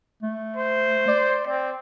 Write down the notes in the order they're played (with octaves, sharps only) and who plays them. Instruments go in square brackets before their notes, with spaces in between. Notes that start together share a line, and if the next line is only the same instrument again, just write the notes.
[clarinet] A3
[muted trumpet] C5
[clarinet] D5
[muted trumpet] C4 [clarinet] D5